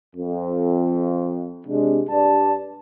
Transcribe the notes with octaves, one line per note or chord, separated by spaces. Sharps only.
F2
C3 G#3 D4
G2 D5 A5